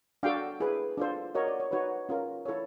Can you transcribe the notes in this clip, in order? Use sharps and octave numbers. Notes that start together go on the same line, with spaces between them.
D4 F#4 A4 F5 G5
E4 G#4 B4
D4 F4 A4 C5
F#4 A#4 C#5 D#5
D5
C#5
D#4 F#4 B4 C#5
C#4 F4 A#4
E4 A4 C#5